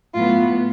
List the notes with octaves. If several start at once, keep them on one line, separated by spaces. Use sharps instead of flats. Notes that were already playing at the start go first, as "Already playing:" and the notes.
A2 F#3 B3 F4